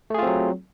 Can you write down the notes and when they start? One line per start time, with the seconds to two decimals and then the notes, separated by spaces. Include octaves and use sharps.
0.10 A3
0.14 G#4
0.19 F4
0.23 C4
0.27 F#3